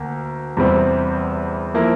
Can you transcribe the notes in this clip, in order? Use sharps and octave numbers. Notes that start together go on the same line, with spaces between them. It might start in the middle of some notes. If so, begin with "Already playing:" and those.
Already playing: D2 A#3
E2 C3 G3 C4
F3 A#3 E4